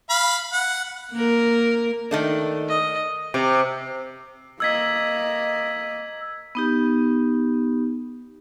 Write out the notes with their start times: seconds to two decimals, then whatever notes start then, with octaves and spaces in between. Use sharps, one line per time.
0.10 F5 B5
0.53 F#5
1.12 A#3 A#4
2.11 D#3 A3 D4
2.68 D#5
3.34 C3
4.60 A#3 D#5 E6 G#6 B6
6.55 B3 D#4 G4